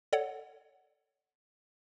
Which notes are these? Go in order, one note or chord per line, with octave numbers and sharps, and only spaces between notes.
A4 C#5 D5 F#5